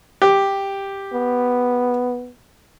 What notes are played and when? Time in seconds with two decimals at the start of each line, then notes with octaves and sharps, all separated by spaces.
0.22 G4
1.13 B3